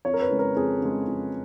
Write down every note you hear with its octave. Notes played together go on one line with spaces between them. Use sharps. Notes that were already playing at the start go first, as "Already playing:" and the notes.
F2 C#5
A#4
B4
C#3 G#3
A#4
F2 G#4
C#3 G#3
F2